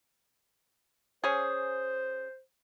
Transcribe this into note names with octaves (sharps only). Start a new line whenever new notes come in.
C#4 G#4 C5